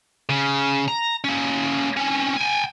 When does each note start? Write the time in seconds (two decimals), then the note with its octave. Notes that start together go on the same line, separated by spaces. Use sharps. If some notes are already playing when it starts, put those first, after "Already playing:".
0.29 C#3
0.88 A#5
1.24 A#3 C#4
1.97 C4 C#4
2.36 G5 G#5